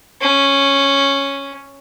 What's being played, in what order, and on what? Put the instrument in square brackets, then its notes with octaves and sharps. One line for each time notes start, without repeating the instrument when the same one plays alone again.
[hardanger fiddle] C#4